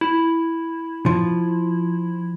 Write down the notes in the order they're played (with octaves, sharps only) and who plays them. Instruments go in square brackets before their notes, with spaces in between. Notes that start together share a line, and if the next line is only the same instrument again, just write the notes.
[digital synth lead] E4
[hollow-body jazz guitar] F3